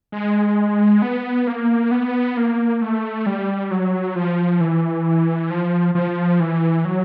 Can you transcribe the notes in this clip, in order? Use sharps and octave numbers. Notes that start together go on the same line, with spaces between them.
G#3
B3
A#3
B3
A#3
A3
G3
F#3
F3
E3
F3
F3
E3
F#3